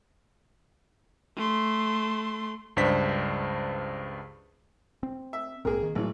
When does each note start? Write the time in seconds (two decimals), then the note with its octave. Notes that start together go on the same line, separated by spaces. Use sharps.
1.36 A3 C6
2.76 C#2 G2 D4 C5 B6
5.03 C4
5.33 E5
5.65 A#1 G#2 A#3 C4 G#4 A#4
5.83 D#3
5.95 G#1 A2 E3 F#3 A3